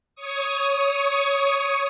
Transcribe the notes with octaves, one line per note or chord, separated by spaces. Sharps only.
C#5 C#6 D#6